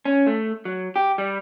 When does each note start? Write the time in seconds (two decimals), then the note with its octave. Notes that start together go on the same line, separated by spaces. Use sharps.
0.05 C#4
0.27 A3
0.65 F#3
0.96 G4
1.18 G3